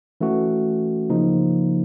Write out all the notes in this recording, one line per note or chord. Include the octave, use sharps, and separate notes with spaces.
E3 A3 C#4 F#4
C#3 F3 A#3 D#4